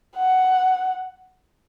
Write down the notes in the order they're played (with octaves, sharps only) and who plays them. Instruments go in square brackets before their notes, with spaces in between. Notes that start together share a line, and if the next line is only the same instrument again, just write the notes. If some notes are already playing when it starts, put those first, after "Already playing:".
[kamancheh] F#5